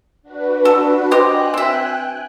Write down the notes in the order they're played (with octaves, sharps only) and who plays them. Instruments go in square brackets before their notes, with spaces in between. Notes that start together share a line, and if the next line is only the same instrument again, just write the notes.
[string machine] D4 F#4 B4
[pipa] A4
[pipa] G4 C5 D#5 [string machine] G5 G#5 F#6
[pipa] C4 E5